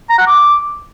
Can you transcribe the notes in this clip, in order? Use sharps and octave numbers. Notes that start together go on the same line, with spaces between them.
A#5
F#5
D6